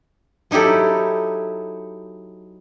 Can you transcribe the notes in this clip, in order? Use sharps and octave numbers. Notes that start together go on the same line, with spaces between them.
F#3 D#4 E4 G4 A4